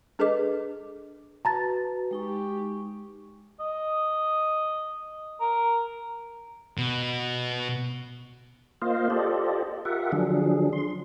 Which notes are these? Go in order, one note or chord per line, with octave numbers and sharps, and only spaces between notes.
D4 G#4 A4 B4 D#5 D6
F#4 B4 A5 A#5 A6
G#3 D#4 G4 C#6
D#5
A#4
B2
A#3 F4 C5 D#5 F5
F4 G4 A4 C5 D5 D#5
F4 G4 A#4 E5 F#5
D3 F3 F#3 D4 G#4
C6